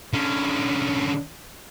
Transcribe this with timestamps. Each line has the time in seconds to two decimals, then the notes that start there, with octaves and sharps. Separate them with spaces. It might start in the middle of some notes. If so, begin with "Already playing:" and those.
0.14 D3 C#4